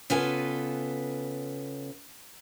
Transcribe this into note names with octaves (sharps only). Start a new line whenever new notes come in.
C#3 B3 F4 A4 B4 G#5